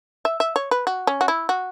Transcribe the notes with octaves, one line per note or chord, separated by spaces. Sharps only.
E5
E5
C#5
B4
F#4
C#4
F#4
E4
F#4